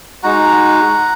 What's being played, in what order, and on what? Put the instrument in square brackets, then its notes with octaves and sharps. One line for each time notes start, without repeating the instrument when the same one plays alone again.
[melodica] G#3 D#4 F#4 F#5 A#5